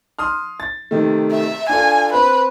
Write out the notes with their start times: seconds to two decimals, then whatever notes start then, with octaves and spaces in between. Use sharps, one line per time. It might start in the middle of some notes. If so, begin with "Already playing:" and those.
0.19 C6 D#6 F6
0.60 A6
0.91 C3 D#3 A3
1.32 E5
1.69 D4 F4 A4 G#5
2.14 C4 B4